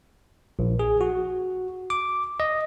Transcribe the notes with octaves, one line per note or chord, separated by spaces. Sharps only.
A#1
G#4
F#4
D6
D#5